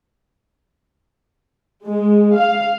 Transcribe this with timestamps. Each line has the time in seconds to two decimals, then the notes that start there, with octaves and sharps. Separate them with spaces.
1.85 G#3
2.37 F5